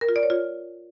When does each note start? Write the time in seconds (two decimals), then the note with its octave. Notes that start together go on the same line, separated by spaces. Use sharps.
0.01 A#4
0.09 F4
0.16 D5
0.23 C#5
0.30 F4